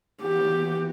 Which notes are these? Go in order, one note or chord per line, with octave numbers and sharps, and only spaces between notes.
E3 B3 F#4 G4